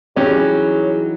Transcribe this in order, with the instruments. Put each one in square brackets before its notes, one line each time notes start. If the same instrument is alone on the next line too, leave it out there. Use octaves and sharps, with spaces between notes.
[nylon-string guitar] E3 F#3 D#4 [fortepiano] G3 C#4 G4 [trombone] G#4 [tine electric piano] C#5